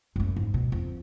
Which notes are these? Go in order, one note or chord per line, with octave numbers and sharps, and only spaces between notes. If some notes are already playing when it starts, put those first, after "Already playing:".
F#2 A3
G#2
B2
F2